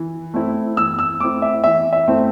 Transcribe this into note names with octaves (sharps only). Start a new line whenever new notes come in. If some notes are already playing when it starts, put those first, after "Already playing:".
Already playing: E3
A3 C4 E4
E3 E6
E6
A3 C4 E4 D6
E5
E3 E5
E5
A3 C4 E4